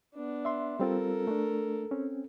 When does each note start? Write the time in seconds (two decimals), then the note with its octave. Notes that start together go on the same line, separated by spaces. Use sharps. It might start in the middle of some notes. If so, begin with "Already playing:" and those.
0.15 B3 D4
0.45 E5 C6
0.80 G3 C4 F4 A4 A#4
1.27 A3 D4
1.91 C4 C#4